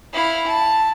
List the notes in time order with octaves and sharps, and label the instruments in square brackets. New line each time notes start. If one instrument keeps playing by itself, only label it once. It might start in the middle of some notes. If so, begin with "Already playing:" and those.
[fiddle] E4 F5
A5